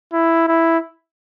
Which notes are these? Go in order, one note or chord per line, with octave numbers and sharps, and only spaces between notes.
E4
E4